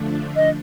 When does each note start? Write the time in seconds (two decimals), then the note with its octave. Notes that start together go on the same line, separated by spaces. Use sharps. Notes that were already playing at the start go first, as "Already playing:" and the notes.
Already playing: D3 F3 A3 D4
0.36 D#5